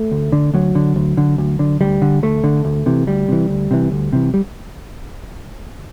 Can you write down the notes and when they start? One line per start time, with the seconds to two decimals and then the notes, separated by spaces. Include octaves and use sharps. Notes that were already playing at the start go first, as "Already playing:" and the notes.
Already playing: A3
0.11 D2
0.32 D3
0.54 D2 F#3
0.75 D3
0.96 D2
1.17 D3
1.38 D2
1.59 D3
1.81 D2 G3
2.02 D3
2.23 D2 A3
2.44 D3
2.65 D2
2.86 C3 E3
3.07 D2 G3
3.28 C3 E3
3.49 D2
3.71 C3 E3
3.92 D2
4.13 C3 E3
4.34 G3